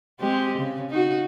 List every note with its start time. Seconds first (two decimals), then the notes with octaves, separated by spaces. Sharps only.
0.20 G#3 C4 G4
0.58 C#3
0.90 D#4 F#4